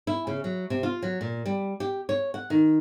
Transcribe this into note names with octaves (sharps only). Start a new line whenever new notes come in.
E4
C#3
F#3
C3
F4
F#3
A#2
G3
G4
C#5
F#5
D#3